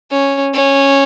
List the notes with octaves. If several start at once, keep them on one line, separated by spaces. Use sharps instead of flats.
C#4
C#4